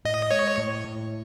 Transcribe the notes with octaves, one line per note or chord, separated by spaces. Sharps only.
A2 D#5
G#3 C#5
A2
A2